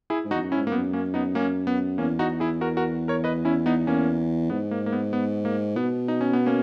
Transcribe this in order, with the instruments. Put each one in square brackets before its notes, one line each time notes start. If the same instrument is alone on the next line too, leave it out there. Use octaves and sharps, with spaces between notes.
[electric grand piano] E4 G#4
[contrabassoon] G#2
[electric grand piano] D#4 F#4
[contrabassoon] E2
F#2
[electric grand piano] C#4 E4
[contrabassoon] G#2
[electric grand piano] A#3
[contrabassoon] F#2 [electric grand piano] B3
[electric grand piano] A#3 C#4
B3 D#4
A#3 C#4
B3
[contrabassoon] E2 [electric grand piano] A#3 C#4
[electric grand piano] D#4 F#4
E4 G#4
F#4 A#4
F#4 A#4
A#4 C#5
B4 D#5
C#4 E4
B3 D#4
A#3 C#4
[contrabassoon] G#2 [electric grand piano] B3
[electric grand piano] A#3
A#3
B3
B3
A#3
[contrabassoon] B2 [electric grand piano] B3
[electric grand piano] D#4
C#4
B3
A#3 C#4